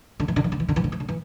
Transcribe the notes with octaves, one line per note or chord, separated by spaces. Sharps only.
D3
E3
D3
E3
D3
E3
D3
E3
D3
E3
D3
E3